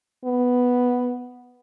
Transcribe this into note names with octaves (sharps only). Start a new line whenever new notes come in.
B3